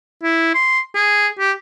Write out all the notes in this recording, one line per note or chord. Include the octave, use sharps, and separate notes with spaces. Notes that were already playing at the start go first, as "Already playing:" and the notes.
E4
C6
G#4
G4